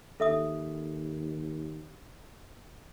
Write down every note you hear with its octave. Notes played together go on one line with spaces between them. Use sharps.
D#2 A4 E5 D#6